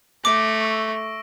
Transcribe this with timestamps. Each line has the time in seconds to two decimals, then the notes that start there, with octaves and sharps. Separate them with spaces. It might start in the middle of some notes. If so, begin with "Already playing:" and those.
0.25 A3 D6 A#6 D7
0.60 C#6 E6